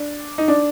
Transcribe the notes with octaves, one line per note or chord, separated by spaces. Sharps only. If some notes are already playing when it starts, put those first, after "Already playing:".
Already playing: D4
D#4
D4